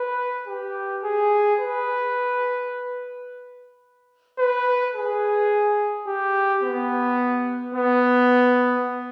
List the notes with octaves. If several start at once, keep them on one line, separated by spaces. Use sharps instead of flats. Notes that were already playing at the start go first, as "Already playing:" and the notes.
Already playing: B4
G4
G#4
B4
B4
G#4
G4
B3
B3